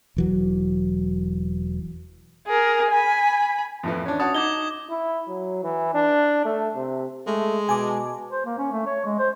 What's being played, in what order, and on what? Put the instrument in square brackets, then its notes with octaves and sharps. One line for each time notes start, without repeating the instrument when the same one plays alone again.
[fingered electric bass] E1 E3 F#3
[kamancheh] G#4 A#4
G#5 B5
[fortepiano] F2 A2 E3
C#4 D4
[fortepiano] C#4 F#4 A5 [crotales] D#6
[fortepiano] D#4 [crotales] D6 G#6 G7
[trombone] E4
F#3
E3
D4
A3
C3
[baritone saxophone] G#3 [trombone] A3
[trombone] B2 [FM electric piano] G#5 A5 D6
[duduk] C5
A#3
C#4
A3
C#5
G#3
C5